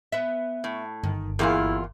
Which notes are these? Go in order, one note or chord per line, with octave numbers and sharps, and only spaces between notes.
B3 E5
A2
G1 D#3
E2 A#2 E4 F4 G4 G#4 A#4